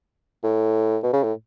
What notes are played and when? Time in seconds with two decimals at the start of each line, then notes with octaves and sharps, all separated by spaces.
0.43 A2
1.03 B2
1.13 C#3
1.24 A2